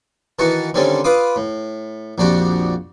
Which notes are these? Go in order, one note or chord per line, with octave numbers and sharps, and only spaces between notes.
D#3 E3 F#4 A5 C#6
D3 D#3 G3 C4 C#4 A4
F4 B4 F5 B5 D6 D#6
A2
A#1 F2 D4 F#4 G4